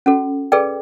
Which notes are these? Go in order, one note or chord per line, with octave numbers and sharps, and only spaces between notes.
C#4 F#4 A4
G#4 A4 B4 D5 G5